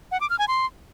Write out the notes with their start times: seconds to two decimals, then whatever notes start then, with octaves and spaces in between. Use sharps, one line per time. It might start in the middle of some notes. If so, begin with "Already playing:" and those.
0.12 F#5
0.21 D6
0.30 F6
0.39 G#5
0.48 C6